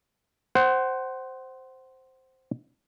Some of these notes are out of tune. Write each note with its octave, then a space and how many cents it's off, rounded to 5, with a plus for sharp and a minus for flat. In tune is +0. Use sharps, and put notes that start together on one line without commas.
C5 +0 F#5 +30